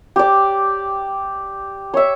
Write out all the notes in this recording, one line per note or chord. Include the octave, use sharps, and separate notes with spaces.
G4 D5
C#5 E5